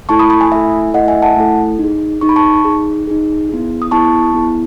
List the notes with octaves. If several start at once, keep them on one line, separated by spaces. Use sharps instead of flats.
A3 E4 A4 A5 C#6
B5 D#6
B5 D#6
G#5 B5
A3 E4 A4 E5 G#5
A3 E4 A4 D#5 F#5
E5 G#5
F#5 A5
A3 E4 A4
D#4 G#4
D#4 G#4 C#6
B5
A5 C#6
D#4 G#4
D#4 G#4
B3 E4 G#4
D#6
B3 E4 G#4 A5 C#6
B3 E4 G#4